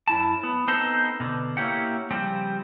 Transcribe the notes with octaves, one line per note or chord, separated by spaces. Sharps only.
F#2 E4 A5
B3
B3 C4 D#4 A4 C5
B2 D3
A#3 C#4 E4 G4 F#5
C#3 F3 G3 C4